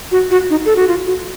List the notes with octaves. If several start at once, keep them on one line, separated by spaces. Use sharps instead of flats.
F#4
F#4
D#4
A4
F#4
F4
F#4